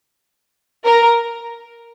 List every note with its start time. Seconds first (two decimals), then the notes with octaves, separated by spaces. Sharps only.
0.85 A#4